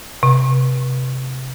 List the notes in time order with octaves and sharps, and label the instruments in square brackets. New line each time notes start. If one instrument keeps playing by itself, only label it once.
[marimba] C3